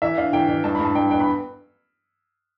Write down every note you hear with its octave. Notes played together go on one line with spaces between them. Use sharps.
E3 E5
D4 F5
E3 G5
E3
G2 A5
B5
G2
A5
G2 G5
B3 G5
B5